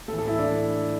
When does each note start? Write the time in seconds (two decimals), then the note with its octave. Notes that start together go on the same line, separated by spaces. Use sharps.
0.08 A2 E3 A4
0.18 A4
0.28 E4
0.39 D4